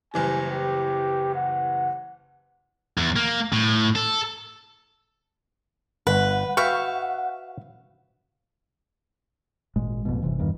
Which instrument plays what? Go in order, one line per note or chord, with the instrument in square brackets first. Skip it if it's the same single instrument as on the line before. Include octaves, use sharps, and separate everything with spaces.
[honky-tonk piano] F#1 E3 G3 [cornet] G#5
[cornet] G4
F#5
[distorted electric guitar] E2
A#3
A2
A4
[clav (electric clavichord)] G1 [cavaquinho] B4 [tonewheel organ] F#5
[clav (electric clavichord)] F#4 B4 G5 [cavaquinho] E5 F5 C#6
[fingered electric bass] G#1 A#2 G#3
A1 F2 B2
G1 C3 E3
E2 G2 D#3